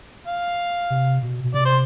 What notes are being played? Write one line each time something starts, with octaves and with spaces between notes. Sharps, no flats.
F5
C3
B2
B2
C3 D5
C5